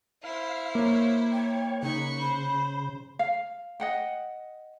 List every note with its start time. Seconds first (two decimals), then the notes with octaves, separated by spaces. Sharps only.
0.24 E4 C5 F5
0.75 A#3 C#5
1.32 C#5 G5
1.83 C#3 D#4 B5 C#6 F#6
2.20 C5 B5
3.19 F5
3.80 D#5 F#5 G5